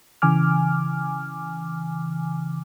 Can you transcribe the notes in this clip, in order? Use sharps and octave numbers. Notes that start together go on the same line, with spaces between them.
C#3 E3 G#5 D6 F6